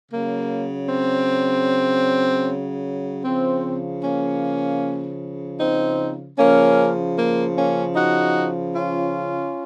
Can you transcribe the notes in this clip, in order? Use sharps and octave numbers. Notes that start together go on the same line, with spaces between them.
C#3 F#3 A#3
C4
C#3 F3 C4
A#3 C#4
C4 D#4
C#3 F3 A#3 C#4
A#3
A#3 C#4
D#4 F#4
C#4 F4